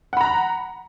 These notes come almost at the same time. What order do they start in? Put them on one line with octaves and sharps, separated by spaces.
F#5 B5 A#5